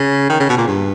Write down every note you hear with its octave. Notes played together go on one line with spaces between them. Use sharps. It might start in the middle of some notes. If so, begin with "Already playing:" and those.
Already playing: C#3
D#3
C#3
B2
A#2
G2